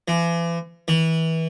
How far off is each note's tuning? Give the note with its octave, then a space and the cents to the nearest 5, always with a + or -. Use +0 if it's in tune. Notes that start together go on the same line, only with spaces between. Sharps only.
E3 +40
E3 -25